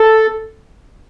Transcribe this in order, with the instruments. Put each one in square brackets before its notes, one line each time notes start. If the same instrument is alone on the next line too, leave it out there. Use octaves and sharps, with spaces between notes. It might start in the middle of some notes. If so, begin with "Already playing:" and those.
Already playing: [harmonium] A4